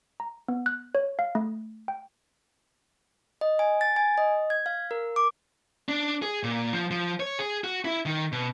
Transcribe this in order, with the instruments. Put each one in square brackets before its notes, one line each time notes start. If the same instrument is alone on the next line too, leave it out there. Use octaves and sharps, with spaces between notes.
[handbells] A#5
B3
F#6
C#5
F5
A3
G5
[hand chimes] D#5
G#5
A6
G#5
D#5
G#6
F5
A#4
D6
[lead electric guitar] D4
G#4
A#2
F3
F3
C#5
G#4
F#4
E4
D#3
B2